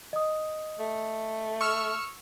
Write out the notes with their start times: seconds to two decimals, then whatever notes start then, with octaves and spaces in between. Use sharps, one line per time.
0.13 D#5 D#6
0.79 A3
1.61 C#6 E6 F6